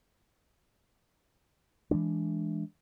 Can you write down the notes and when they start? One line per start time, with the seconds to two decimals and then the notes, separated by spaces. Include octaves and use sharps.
1.91 E3 F3 G#3 D4